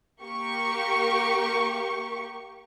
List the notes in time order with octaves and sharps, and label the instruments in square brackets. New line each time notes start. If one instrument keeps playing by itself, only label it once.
[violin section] A#3 G4 C#6